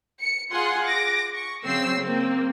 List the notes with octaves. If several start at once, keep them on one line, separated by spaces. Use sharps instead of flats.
C#7
F4 G#4 F#5 G#5 C6
D6 A#6
C#6
C#3 F#3 C4 E6 C7
A#3 C4